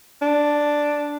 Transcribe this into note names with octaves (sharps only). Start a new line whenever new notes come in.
D4